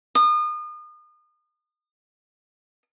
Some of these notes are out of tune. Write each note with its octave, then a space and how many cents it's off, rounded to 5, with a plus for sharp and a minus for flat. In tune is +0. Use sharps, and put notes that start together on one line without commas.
D#6 -35